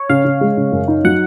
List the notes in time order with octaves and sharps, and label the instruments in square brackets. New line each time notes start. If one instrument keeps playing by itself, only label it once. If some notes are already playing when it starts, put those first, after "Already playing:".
Already playing: [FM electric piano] C#5
[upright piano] C#3 [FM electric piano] F5
[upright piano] C#3
G#3
C#3
F#2
D#4
[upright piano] F#3 [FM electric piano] F#5